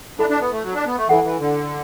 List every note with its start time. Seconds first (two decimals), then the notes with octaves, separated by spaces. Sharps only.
0.19 D4 E4 A4 E5 B5
0.29 D4
0.41 B3
0.52 A3
0.64 F#3
0.75 D4
0.86 B3
0.98 A3
1.08 E3 E4 A4 F#5
1.24 E3
1.39 D3